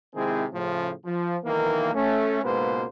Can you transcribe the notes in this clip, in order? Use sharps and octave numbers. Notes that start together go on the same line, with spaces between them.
C3 D#3 G#3 C4 E4 G#4
A2 C#3 F3
F3
B1 D#3 E3 A#3
A3 C#4
C#2 G#2 B2 A#3 B4 C5